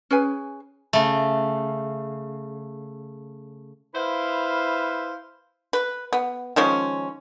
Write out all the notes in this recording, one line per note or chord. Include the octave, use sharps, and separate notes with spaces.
C#4 G#4 B4 G#5
C#3 A3
E4 B4 C5 E5 F5
B4
B3
D#3 F3 G#3 C#4